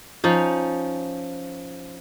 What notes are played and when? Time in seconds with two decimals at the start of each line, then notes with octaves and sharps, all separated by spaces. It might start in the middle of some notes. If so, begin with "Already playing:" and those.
0.24 F3 C#4 D#4